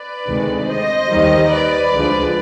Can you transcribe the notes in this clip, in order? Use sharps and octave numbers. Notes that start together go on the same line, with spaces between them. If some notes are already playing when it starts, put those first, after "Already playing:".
Already playing: B4 D5
D2 C3 D#3 G#3
C5 D#5
D#2 D#3 G3
B4 D5
D2 D3 F3 G#3